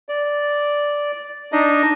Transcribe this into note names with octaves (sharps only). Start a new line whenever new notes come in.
D5
D4 D#4 D#5